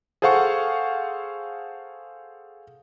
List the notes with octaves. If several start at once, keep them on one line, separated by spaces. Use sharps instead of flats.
G#4 A4 C5 F5 F#5 C#6